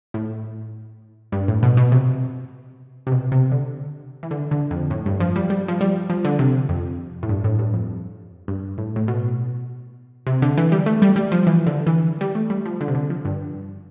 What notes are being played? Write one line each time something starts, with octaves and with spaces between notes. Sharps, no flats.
A2
G2
A2
B2
B2
C3
C3
B2
C3
D3
E3
D3
D3
F2
A2
G2
F3
G3
G3
F3
G3
F3
D3
C3
F2
A2
G2
A2
G2
F2
G2
A2
A2
B2
C3
D3
E3
G3
A3
G3
G3
F3
E3
D3
E3
G3
A3
G3
F3
D3
C3
D3
F3
G2